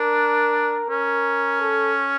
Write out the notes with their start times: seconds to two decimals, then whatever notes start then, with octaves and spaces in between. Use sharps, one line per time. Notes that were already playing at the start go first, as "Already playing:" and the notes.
Already playing: D4 A#4
0.90 C#4 A#4
1.61 A4